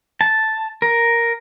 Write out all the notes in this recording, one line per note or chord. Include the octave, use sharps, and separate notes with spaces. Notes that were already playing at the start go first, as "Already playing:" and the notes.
A5
A#4